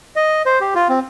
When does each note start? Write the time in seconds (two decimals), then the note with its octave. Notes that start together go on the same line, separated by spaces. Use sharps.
0.16 D#5
0.46 C5
0.61 G4
0.75 F4
0.89 C4